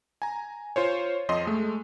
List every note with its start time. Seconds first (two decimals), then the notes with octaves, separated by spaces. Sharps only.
0.22 G#5 A#5
0.76 F4 C5 C#5
1.29 F2 F3 D#5 C6
1.46 G#3 A3